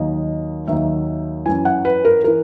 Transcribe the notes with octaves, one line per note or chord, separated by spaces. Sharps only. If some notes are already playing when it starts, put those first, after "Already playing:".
Already playing: D#2 D#3 F#3 D#5
D#2 D#3 F#3 E5
F#2 E3 G#5
F#5
B4
A#4
E3 A#4